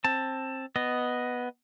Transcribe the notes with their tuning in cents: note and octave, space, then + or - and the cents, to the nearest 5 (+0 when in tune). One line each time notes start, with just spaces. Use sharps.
C4 +20 A5 +10
B3 +0 D#5 +0